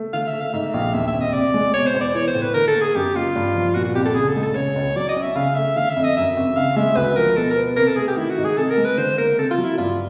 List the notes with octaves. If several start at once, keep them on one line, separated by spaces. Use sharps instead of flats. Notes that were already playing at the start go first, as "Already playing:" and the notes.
Already playing: A3
D3 F5
E5
A3
F5
G#2 E5
A#1 F5
D#2 E5
E5
F1
D#5
C3 D5
G#3
B2 C#5
C5
E2
D5
E3 C#5
C5
A2
B4
D3 A#4
A4
A#3
G#4
F#2 G4
F#1 F4
G2
F3
A#2 F#4
F#4
C2 G4
A4
C#3 G#4
A4
G#3
A4
C#3 C#5
C#2
F#3 D5
D#5
C#4
E5
C#3 F5
A3 E5
D3 F5
E5
F2
D#5
F#2 E5
G#1
C#3 F5
G#3 E5
D2 B4
F3 A#4
B2 A4
A#4
B3
C3 A#4
A4
A3 G#4
G4
D#3 E4
F#4
G#2
G#4
C3 A4
A#4
G#3
B4
D3 C5
A#3 A#4
C3 A4
F4
F#3
E4
G2 F4